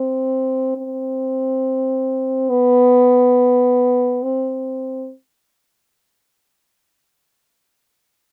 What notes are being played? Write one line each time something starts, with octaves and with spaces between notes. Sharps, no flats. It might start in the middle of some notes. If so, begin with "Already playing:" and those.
Already playing: C4
C4
B3
C4